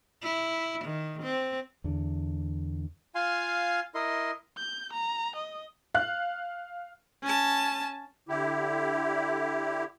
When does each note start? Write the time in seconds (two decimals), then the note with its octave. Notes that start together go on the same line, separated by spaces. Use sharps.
0.23 E4
0.85 D#3
1.22 C4
1.84 E2 D3
3.15 F4 F5 G#5 C6
3.95 E4 A#4 D#5 C6
4.58 G6
4.93 A#5
5.36 D#5
5.94 F5 F#6
7.23 C#4 A5
8.29 D3 E4 G4